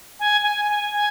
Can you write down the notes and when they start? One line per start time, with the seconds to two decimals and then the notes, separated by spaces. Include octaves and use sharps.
0.20 G#5
0.44 G#5
0.70 G#5
0.94 G#5